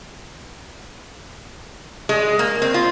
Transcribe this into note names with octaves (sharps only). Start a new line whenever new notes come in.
G#3
A#3
C4
F4